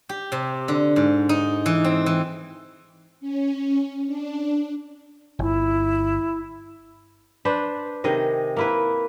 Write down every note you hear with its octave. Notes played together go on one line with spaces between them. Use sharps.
G4
C3
D3
G#2
D#4
E3
C4
E3
C#4
D4
G1 E4
D4 B4 C5
C3 D#3 G#4 D#5
A#3 E4 B4